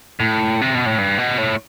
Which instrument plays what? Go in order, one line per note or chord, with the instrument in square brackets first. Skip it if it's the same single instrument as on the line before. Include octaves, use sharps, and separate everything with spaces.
[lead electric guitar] A2
C3
B2
A2
G2
B2
A2